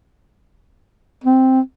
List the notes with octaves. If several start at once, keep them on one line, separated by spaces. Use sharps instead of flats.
C4